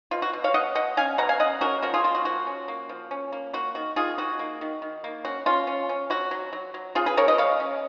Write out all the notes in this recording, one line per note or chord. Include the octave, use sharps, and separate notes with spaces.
B2 F4
F#4
B2
C#5 F5
B2 D#5 F#5
B2 D#5 F#5
C#4 F5 G#5
B2 F#5 A#5
F5 G#5
C#4 D#5 F#5
C#4 F#4 A#4
F3 F#4 A#4
F4 G#4
A#3 F4
F#4
F3 F#4
C#4
A#3
F3
C#4
A#3
A#3 F#4
D#3 F#4
D#3 F4 G#4
D#4 F#4
A#3
D#3
D#3
A#3
C#4 F#4
C#4 F4
C#4
C#4
F#3 F#4
F#3
F#3
F#3
C#3 F4 G#4
G#4 B4
C#3 A#4 C#5
B4 D#5
G#3 C#5 F5
C#4